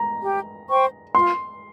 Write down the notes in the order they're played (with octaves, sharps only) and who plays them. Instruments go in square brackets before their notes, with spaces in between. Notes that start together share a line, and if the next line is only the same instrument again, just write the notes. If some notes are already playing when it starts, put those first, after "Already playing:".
Already playing: [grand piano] A#5
[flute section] G4
C5 G5 C#6
[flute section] F4 [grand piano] C6